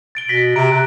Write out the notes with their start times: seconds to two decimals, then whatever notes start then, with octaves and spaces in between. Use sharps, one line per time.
0.15 A6 D7 G7
0.28 B2 A#6 B6 F#7
0.56 C3 A#5 D7
0.72 C3 F#6